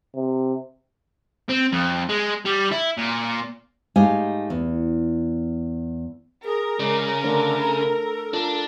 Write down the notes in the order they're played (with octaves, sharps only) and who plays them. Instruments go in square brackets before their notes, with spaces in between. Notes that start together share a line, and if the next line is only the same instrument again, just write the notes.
[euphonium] C3
[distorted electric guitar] C4
F2
G#3
G3
E4
A#2
[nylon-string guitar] G#2 A3 D#4 G4 F5 G#5
E2
[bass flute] G#4 [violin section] A#4
[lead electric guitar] C#3 [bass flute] G#3 [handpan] D5
[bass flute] D3 [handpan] A3 D4 C5
[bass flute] A4
[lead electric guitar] D4 [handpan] F4